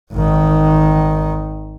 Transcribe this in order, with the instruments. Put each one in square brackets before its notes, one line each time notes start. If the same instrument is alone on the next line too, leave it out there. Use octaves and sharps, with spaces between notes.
[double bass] G#1 D#3